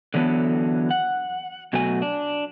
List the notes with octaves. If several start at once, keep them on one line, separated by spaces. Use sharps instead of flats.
D3 E3 F#3 B3 A4
F#5
B2 F#3 A3 F#4 G#5
D4